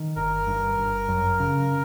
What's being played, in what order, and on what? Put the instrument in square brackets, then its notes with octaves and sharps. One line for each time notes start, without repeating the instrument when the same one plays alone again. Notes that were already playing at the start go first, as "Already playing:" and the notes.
Already playing: [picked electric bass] D#3
[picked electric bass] G1 [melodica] A#4
[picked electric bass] G2
G1
F#2
C#3